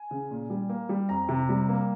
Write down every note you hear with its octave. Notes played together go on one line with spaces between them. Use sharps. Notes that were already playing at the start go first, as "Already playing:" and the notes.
Already playing: G#5
C#3
A#2
G3
A#3
G3
F2 A#5
C3
G3
A#3